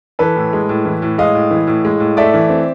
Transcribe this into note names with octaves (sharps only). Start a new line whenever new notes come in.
E3 A4 B4
A2
G#3
A2
E3
A2
G#3 D#5 F5
A2
E3
A2
G#3
A2
A3 D5 E5
E3
C4